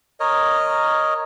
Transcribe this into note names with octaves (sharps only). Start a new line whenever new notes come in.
A#4 C#5 D#5